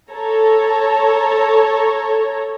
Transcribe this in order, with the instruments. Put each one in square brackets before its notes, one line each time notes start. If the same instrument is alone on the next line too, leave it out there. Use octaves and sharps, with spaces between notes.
[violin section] A4 C#5 A#5